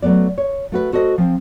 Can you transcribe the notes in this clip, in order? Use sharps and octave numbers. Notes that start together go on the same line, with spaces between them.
F#3 A3 B3 D5
C#5
A3 F#4 B4
F#4 A4 C5 D#5
F3 C4